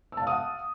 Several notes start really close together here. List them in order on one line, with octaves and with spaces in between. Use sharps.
E6 A5 F5 D#6 F#5